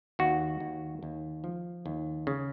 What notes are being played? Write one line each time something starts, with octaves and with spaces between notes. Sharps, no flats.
D#2 F#4
D#2
D#2
F3
D#2
C#3